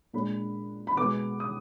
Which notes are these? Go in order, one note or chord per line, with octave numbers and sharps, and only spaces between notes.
A#2 G#3 D4 B5
B5
B2 G#3 B3 D6
D#6